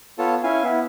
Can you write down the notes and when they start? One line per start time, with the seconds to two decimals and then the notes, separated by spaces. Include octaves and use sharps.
0.19 B3 F4 A4 C#5 A5
0.43 C#4 E4 F5 G#5
0.63 B3 E4